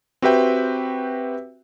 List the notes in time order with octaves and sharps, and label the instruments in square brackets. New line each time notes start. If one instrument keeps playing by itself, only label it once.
[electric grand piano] C4 F#4 G4 B4 E5 G5